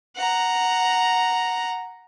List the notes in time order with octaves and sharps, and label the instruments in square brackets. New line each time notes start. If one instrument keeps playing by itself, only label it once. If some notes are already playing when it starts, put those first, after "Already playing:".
[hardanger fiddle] F#5 A#5